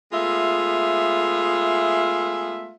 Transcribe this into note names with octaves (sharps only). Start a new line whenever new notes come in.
G#3 A3 B3 F4 E5